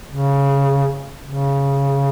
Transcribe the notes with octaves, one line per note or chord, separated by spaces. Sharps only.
C#3
C#3